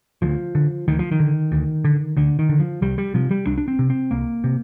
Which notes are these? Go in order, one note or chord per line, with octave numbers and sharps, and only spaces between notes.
D2 F3
D3
D2 D#3
F3
D#3
D3
D2
D3
D2 D3
D#3
D3
F3
C2 G3
G3
C3 F3
G3
C2 D4
D4
C4
C3
C4
C2 A#3
C3